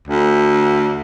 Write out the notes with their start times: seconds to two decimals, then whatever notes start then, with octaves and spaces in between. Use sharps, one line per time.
0.08 D2